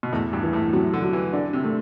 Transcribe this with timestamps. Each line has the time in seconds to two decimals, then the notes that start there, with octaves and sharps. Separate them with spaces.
0.03 B2
0.13 E2 A2
0.33 G2
0.43 E3
0.53 A2
0.73 C3 F#3
0.93 D3
1.03 F#3
1.13 E3
1.33 D3 D4
1.53 C3
1.63 A3